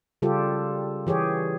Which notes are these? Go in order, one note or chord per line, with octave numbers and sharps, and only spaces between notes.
C#3 G3 F4 G4 A4
E3 G4 G#4 C#5